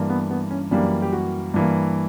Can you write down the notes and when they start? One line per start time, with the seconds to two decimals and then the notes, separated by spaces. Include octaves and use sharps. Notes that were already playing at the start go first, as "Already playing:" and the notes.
Already playing: G2 E3 A#3
0.10 B3
0.31 B3
0.51 C#4
0.71 F#2 E3 G3 A#3 D4
1.02 G4
1.13 F#4
1.54 G2 E3 A#3